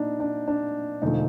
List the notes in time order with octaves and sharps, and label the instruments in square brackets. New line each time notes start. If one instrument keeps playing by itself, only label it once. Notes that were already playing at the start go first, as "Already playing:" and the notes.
Already playing: [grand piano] A#2 D4 D#4
D4
D4
E1 D2 D3 F3 A3 D#4